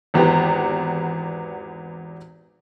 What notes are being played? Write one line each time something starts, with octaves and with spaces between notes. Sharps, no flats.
G#1 E2 B3 G4